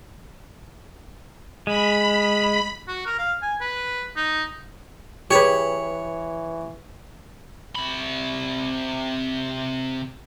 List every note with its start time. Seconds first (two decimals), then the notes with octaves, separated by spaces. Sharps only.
1.67 G#3 B5
2.88 F#4
3.06 A#4
3.19 F5
3.42 G#5
3.61 B4
4.17 D#4
5.31 E3 G4 G#4 B4 C#5
7.75 C3 B5